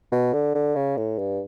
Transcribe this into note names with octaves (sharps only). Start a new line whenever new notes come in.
B2
D3
D3
C#3
A2
G2